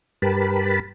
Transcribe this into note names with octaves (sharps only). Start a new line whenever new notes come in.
G2 G4 A#4 B4 A5 B5